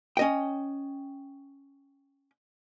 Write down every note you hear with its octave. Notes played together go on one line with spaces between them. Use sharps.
C#4 D#5 G5